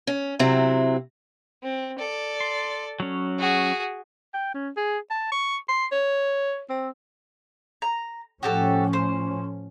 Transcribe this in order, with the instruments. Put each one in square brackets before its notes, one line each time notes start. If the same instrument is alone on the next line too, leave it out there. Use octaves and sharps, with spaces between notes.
[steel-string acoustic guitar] C#4
C3 F#3 C4 E4
[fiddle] C4
A4 D5
[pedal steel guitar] C6
F#3 C#4
[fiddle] F#4 G#4
[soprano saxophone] G5
C#4
G#4
A5
C#6
C6
C#5
C4
[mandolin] A#5
[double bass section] A2 F3 C#4 [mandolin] F#4 G4 A4
[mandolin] C5